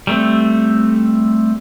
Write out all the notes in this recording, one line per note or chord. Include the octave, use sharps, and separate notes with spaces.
G3 A3 C4